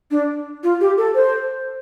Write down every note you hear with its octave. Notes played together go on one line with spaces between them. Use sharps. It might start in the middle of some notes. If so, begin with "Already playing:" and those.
D4
F4
G4
A4
C5